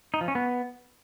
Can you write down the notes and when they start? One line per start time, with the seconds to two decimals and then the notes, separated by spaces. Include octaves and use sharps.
0.14 D#4
0.21 F3
0.28 C#4
0.35 B3